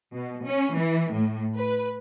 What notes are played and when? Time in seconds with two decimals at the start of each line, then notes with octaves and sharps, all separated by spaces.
0.14 B2
0.47 C#4
0.76 E3
1.13 A2
1.56 B4